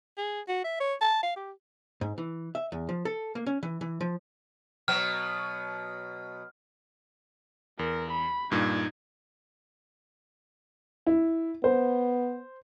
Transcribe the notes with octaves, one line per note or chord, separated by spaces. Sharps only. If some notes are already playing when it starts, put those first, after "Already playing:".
G#4
F#4
E5
C#5
A5
F5
G4
G#2
E3
E5
E2
F3
A4
A#3
C#4
E3
E3
F3
B2 F#3 B3 F6
E2 A#4
B5
G2 A#2 D#4 G#6
E4
B3 C5